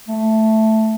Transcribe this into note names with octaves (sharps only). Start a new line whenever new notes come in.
A3